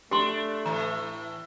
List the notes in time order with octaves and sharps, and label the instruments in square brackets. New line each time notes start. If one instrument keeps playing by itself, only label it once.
[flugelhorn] A3 [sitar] D4 [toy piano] G4 C6
[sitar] A2 E3 [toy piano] A#5